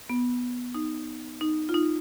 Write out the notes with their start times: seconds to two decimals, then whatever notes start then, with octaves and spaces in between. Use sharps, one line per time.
0.09 B3
0.75 D#4
1.41 D#4
1.69 F4
1.74 D#4